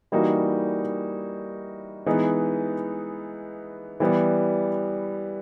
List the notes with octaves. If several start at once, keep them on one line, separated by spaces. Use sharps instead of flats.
E3 G3 A#3 D#4 F#4
E3 G#3 B3 D#4
E3 G3 B3